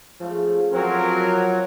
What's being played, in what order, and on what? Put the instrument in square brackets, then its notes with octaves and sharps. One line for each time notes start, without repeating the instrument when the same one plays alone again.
[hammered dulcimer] C#3 A3 [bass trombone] F3
[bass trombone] F3 [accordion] F#3 [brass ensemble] C4 A#4 [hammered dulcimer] D4 C#5